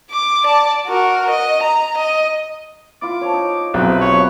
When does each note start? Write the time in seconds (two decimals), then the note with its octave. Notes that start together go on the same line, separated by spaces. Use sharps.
0.11 D6
0.44 D5 A5
0.87 F#4 A#4
1.30 D#5
1.63 A#5
1.97 D#5
3.02 E4 F4 D6
3.21 C#5 A5
3.33 D#4
3.74 B1 C3 F3 B3 B4
4.01 C#5